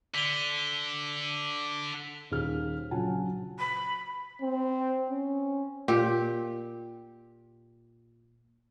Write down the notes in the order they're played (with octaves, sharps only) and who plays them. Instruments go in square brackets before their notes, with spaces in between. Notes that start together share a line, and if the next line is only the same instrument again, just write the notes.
[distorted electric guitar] D3 [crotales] B6 G7
[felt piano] D#1 D#2 G#4 F6
A#1 C#3 F#3 F#5 G#5 A5
[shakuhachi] B5
[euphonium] C4
C#4
[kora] A#2 G4